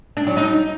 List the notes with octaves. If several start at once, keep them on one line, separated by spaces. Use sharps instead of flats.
D4
F#3
D#4